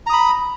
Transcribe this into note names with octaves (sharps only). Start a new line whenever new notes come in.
A#5 B5 D#6